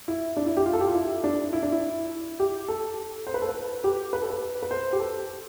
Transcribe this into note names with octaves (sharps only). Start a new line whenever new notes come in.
E4
D4
E4
G4
F4
A4
G4
F4
E4
D4
E4
D4
E4
G4
A4
C5
B4
A4
B4
G4
B4
A4
B4
B4
C5
G4
A4